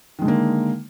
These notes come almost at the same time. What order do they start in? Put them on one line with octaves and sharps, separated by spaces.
D#3 G#3 D3 A#3